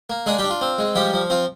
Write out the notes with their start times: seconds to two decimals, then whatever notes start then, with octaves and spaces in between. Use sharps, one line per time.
0.10 A#3
0.26 G#3 D4 G#4
0.38 G3 G4
0.44 D4
0.50 F4
0.61 C4
0.78 G#3
0.95 F3 G3 G4
1.14 F3
1.30 C4 F4